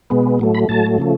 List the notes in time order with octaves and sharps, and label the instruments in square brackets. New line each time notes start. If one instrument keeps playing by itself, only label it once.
[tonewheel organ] B2 G#3 B3
A2 F#3 A3
B5
A2 F#3 A3 A5
C#3 F3 A3